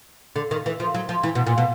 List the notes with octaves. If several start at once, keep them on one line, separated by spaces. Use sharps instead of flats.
D3
D#3
E3
F3
F#3
F3
E3
B2
A#2
B2